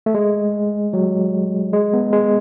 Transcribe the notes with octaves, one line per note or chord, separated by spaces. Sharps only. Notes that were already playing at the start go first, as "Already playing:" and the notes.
A3
G#3
F#3
G#3
B3
G#3